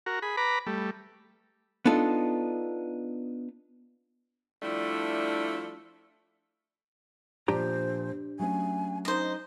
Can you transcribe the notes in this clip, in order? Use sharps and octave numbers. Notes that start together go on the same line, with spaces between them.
F#4 A#4
G#4 B5
B4 A#5 B5 D6
G3 A3
B3 D4 D#4 F4 A4
F3 G3 A3 D4 E4
A#2 F3 D4 G4 C5 A#5
F#3 A3 C#4 G#5
D#4 C5 D#5